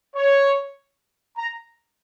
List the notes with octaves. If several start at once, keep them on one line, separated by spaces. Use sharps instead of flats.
C#5
A#5